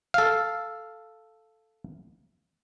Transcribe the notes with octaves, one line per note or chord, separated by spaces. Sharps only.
A4 F5